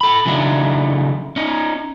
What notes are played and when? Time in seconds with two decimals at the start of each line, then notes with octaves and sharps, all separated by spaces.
0.01 A4 B5
0.26 C#3 E3 F#3 A3 D4 D#4
1.36 C#4 D#4